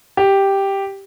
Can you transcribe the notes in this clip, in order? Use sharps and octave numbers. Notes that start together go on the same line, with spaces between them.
G4